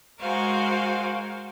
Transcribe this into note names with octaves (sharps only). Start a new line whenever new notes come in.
G#3 F#4 A#4 C5 F5 G#5